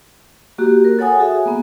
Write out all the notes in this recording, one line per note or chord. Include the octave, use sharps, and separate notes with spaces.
A#3 F#4 G4
A#4
A4 C#5 F#5 G#5 D#6
F#4 G#4 E5
A#3 B3